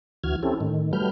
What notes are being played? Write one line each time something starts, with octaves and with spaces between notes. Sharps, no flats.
D2 E3 F#4 F6 G#6
C4 C#4 E4 G4 A4
A2 D#3
F#3 G3 A3 B4 F6 G6